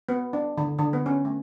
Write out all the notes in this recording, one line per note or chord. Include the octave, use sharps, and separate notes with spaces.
B3
D4
D3
D3
B3
C#4
A3